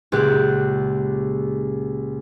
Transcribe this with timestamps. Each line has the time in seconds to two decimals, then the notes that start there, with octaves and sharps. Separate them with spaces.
0.12 C#2 A#2 G4 F#6